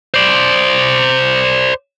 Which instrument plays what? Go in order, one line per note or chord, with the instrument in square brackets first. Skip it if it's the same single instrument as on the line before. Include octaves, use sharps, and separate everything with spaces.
[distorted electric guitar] C5 D5